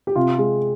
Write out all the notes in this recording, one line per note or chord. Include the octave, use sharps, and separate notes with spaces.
G4
C3 F4
G#3